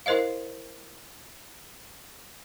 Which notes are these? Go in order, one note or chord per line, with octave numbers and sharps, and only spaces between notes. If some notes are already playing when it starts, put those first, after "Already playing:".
E4 A#4 C5 D#5 F5